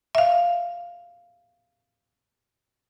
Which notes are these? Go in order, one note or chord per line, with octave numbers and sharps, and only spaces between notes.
E5 F5